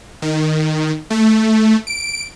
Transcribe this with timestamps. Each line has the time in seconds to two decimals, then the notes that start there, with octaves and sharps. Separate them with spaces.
0.22 D#3
1.10 A3
1.87 D7